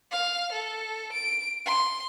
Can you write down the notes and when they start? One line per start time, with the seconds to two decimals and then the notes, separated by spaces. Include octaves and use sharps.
0.11 F5
0.52 A4
1.12 D7
1.66 C6